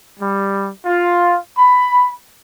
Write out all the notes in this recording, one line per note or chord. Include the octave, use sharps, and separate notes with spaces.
G3
F4
B5